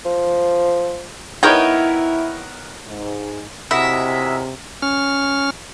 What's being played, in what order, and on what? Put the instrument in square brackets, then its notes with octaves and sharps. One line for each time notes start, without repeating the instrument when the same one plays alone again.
[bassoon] F3
[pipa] B3 G5 [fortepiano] D#4 A#4 C#5 [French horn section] E4
[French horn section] G#2
[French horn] C3 [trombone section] G#3 C#4 A#4 [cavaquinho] E4 F#4 D#5 [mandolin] E5
[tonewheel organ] C#4 F6